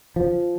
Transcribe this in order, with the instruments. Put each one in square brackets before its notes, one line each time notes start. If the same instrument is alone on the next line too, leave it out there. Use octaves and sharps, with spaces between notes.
[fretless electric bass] F3